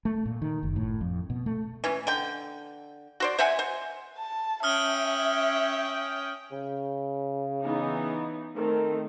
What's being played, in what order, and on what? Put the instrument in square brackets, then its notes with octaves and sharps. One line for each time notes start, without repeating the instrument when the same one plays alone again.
[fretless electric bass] A3
A#2
D#3
F#1
A2
F2
B2
A3
[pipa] E3 C#4
D3 G5
F#4 C5 D5
C5 E5 F#5 G#5
C5
[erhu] A5
[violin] C#4 G5 [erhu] E5 [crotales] D#6 F6 G7
[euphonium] C#3
[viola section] E3 B3 D#4
[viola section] D#3 A3 C4 [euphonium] A#4